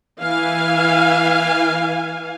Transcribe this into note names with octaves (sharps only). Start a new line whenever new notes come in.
E3 F5 G#5